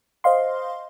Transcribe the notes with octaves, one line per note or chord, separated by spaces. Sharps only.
C5 D#5 F5 C6